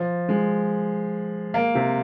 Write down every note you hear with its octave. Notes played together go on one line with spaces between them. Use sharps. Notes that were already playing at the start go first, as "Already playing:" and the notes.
Already playing: F3
G#3
A#3
C3